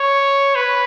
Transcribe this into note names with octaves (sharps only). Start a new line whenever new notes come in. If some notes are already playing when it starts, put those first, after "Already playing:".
Already playing: C#5
B4